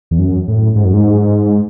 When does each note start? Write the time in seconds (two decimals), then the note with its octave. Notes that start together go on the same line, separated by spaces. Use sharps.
0.11 E2
0.19 F#2
0.48 A2
0.76 G#2
0.85 F#2
0.94 G#2